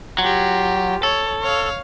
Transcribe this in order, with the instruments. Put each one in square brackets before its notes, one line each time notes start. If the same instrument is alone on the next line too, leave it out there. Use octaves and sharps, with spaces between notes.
[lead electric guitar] F#3 [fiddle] F4 G4
[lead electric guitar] A4 [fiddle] C#5
[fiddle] C#5 F5